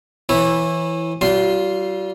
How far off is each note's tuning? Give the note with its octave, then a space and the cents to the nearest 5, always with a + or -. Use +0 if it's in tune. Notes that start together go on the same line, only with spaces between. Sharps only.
E3 +0 E4 -5 C#5 -25
G3 -40 F4 +0 C6 +0